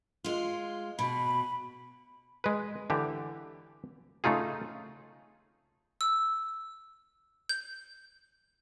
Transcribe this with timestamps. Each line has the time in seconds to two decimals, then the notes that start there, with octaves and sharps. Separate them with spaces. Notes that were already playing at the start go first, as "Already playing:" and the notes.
0.24 G#3 F4
0.99 B2 B5
2.44 G#3 B4
2.90 D3 E3 G4
4.24 C#3 A3 D#4 F4 G#4
6.01 E6
7.49 G6